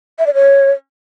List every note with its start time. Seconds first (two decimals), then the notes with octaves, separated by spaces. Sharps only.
0.19 E5
0.26 D5
0.34 C#5